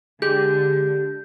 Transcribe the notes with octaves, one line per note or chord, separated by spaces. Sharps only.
D3 G#3 G4 G6